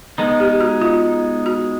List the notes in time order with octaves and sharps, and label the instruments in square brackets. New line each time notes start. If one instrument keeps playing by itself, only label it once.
[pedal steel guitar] G#3 B3 D#4
[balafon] G4
F#4
F4
F#4